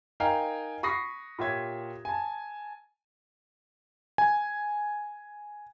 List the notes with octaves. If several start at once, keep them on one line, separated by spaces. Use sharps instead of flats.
D#4 A#4 F5 G5 G#5 A#5
B5 C#6 D#6 A#6 C7
A#2 F4 G4 C#5 E5 G#6
G#5 A5
G#5